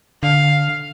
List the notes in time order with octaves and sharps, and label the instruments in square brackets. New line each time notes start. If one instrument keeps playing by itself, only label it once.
[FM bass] D3 [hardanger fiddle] F5